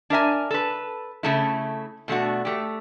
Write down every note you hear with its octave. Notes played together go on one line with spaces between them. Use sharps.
D4 A#4 E5 G#5
A4 B4
C#3 A3 E4
B2 A3 D4 F#4
A3 G4